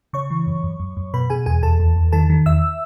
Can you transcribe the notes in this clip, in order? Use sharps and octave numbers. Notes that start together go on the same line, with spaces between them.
C#3 C#5 C#6
E3
F#2
F#2
F#2
F#2
B2 B4 B5
B2 G#4 G#5
E2 G#4 G#5
E2 A4 A5
E2
E2
D#3 A4 A5
D#3
E2 E5 E6